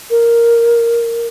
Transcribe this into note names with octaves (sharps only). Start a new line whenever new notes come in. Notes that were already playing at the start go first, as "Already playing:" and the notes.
A#4